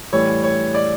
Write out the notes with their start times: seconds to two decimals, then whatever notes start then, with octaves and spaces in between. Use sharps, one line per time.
0.12 A2 E3 G3 C#5
0.43 C#5
0.75 D5